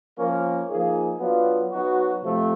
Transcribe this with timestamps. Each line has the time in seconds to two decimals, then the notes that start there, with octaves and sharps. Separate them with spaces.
0.17 F3 A#3 C#4 F4 A#4
0.69 F3 A#3 D#4 G#4
1.20 F#3 B3 D4 F4
1.71 F#3 B3 D#4 F#4
2.23 C3 F3 A3